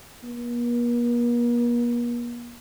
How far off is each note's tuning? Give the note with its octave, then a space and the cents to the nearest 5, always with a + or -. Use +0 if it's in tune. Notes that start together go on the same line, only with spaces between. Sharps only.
A#3 +45